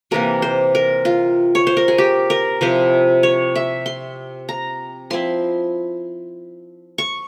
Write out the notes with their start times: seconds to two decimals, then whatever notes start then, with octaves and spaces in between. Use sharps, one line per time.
0.11 C3 E3 A#3 A#4
0.42 C5
0.75 A#4
1.05 F4
1.55 C#5
1.67 C5
1.77 A#4
1.88 G#4
1.98 G4
2.30 A#4
2.61 C3 F3 C4 E4 C5
3.23 C#5
3.55 E5
3.86 C6
4.49 A#5
5.10 F3 C4 E4 C6
6.98 C#6